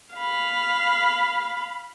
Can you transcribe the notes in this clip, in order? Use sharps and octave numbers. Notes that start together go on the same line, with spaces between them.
F5 B5